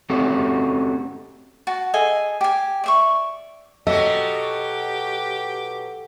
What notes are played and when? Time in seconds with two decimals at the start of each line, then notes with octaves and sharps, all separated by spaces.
0.10 A3 C4 C#4 F#4 G4 A4
1.67 F#4 A5
1.93 G#4 A4 D#5 G#5
2.41 G4 G#5
2.84 D5 E5 C#6
3.87 B2 F#3 G4 A4 D#5